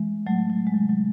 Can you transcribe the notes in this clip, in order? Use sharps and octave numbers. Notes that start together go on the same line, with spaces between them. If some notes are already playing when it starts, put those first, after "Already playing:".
Already playing: E3 G#3
A2 E3 F#3 A3
F#3
G#3
C3 D#3 F#3
F#3